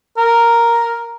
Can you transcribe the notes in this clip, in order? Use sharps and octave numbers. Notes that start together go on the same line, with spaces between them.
A#4